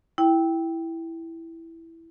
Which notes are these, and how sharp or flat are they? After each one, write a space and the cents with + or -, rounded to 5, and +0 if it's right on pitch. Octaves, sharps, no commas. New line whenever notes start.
E4 +0 G5 +0